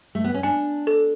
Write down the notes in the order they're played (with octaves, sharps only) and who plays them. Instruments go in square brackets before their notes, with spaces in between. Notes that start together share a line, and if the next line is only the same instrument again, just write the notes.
[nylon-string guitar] A3
B3
C#4
[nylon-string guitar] D4 [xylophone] G#5
[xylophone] A4